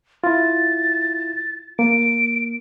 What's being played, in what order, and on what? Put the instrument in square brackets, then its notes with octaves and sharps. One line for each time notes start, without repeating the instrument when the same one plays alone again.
[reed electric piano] E4 F4 [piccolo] A6
[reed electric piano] A#3 [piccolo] D7